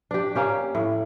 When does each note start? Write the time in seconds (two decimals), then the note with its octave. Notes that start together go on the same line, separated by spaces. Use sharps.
0.11 D4 G4
0.35 A#3 C#4 G4
0.75 A2